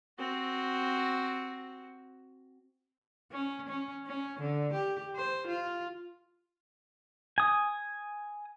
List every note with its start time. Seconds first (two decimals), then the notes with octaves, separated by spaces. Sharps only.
0.19 C4 F#4
3.31 C#4
3.68 C#4
4.06 C#4
4.40 D3
4.73 G4
5.15 C5
5.47 F4
7.38 G#5 D#6